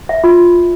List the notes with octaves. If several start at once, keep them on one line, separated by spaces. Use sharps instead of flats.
E5
F4